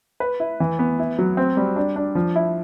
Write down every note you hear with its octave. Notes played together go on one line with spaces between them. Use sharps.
B4
E4
E3
B3
E4
F#3
C4
G3
D4
D4
F3
E4